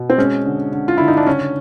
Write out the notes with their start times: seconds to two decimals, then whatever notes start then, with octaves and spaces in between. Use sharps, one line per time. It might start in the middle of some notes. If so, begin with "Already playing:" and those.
Already playing: B2
0.10 C4
0.17 G#3 C#4
0.45 D3
0.72 D3
0.88 F4
0.98 D3 E4
1.08 D#4
1.17 D4
1.27 C#3 C#4